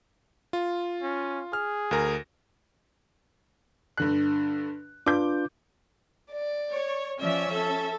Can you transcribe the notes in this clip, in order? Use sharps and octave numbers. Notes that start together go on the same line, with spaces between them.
F4
C#4
G#4 F6
D2 A#4 A#6
G2 D3 F#6
D4 F4 B4 D6 G6
D5
C#5
F3 C#4 D5 E5
A4